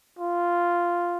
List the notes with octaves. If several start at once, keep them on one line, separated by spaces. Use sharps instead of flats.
F4